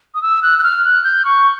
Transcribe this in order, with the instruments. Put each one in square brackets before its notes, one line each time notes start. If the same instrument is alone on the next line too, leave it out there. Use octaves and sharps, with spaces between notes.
[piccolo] D#6
E6
F#6
F#6
F6
F#6
G6
C#6